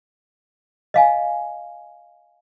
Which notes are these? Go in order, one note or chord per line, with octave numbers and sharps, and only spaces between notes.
D#5 F5 G#5